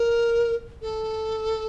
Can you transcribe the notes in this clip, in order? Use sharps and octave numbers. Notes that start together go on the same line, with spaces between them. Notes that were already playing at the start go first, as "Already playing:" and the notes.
Already playing: A#4
A4